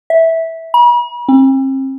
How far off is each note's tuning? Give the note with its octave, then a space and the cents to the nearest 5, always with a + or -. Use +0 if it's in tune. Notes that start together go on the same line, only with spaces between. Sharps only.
E5 -10
B5 -45
C4 +40